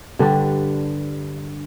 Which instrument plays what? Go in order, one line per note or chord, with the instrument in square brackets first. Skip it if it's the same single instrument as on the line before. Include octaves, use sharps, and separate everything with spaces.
[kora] G2 D3 G3 D4